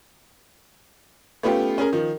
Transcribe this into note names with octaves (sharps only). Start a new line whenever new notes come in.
A3 B3 C#4 F4 G4
C#4 G#4 A#4
D#3 F3